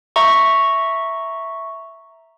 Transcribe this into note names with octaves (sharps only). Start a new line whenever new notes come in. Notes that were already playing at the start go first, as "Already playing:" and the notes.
E5 A#5 C#6